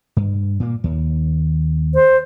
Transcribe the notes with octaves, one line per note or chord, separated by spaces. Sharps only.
G2
A#2 A#3
D#2
C5